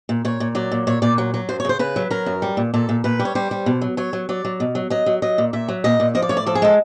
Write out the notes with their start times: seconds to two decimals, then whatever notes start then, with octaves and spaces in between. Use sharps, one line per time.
0.09 A#2
0.25 A#2 C#5
0.40 A#2
0.55 F#3 D5
0.71 A#2
0.87 A#2 C#5
1.02 A#2 D5
1.18 F#3
1.34 F#3
1.49 F#2 C5
1.60 C#5
1.65 C#3 C5
1.79 C#3 B4
1.96 F#3
2.11 F#3 A#4
2.26 F#2
2.42 G3
2.57 A#2
2.74 A#2 A4
2.89 A#2
3.04 A#2 B4
3.20 G3
3.25 C#5
3.35 G3 C5
3.51 G3
3.66 B2
3.81 F#3
3.97 F#3 C#5
4.13 F#3
4.29 F#3 D5
4.45 F#3
4.60 B2
4.75 F#3
4.90 F#3 D#5
5.06 F#3
5.22 F#3 D#5
5.38 A#2
5.53 A#2 E5
5.69 F#3
5.84 A#2 D#5
6.00 A#2
6.15 F3 D#5
6.22 D5
6.29 A2 C#5
6.37 D5
6.46 F3 A4
6.55 G#4
6.62 G#3 A4